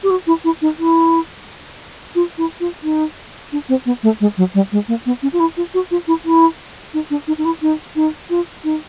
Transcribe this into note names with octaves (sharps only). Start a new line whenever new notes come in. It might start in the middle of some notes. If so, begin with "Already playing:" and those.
G4
F#4
E4
E4
D#4
E4
F4
E4
F4
D#4
D4
C4
B3
A3
G#3
F#3
G3
G#3
A#3
B3
C#4
F4
E4
F4
F#4
F4
E4
E4
D#4
D4
D#4
D#4
E4
D#4
D#4
F4
D#4